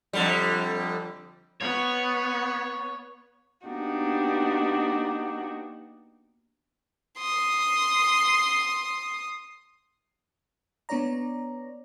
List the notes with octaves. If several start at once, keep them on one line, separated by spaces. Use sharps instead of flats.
F2 D3 G3
B3 C#5
A#3 B3 D4 D#4 F#4 G4
C6 D#6
B3 D4 C#5 D5 A#5